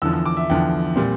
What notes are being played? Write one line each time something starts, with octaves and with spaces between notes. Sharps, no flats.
E2 D3 F3 E6
E6
D6
E5
E2 D3 F3 G5
A#2 G3 C4